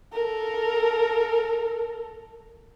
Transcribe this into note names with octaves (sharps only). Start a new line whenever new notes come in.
A4 A#4